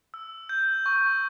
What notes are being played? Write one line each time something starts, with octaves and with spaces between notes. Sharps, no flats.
E6
G6
C#6